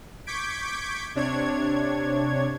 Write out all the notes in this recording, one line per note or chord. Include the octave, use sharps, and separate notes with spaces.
C#6 D6 G6 G#6 B6 D7
C3 D4 C#5 G#6